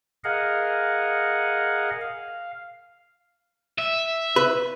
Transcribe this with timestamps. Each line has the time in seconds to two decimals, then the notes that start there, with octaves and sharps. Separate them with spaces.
0.24 G#4 A#4 D#5 F5 F#5
2.01 F5
3.78 E5
4.36 B4